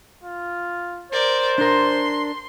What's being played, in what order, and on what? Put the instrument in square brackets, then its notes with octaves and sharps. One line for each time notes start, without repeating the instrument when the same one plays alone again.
[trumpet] F4
[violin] A#4 D5 [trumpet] C5
[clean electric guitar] D4 A#4 [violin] C6